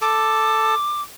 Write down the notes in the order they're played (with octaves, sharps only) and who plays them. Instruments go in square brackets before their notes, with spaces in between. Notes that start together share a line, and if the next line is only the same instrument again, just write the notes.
[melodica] A4 [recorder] D6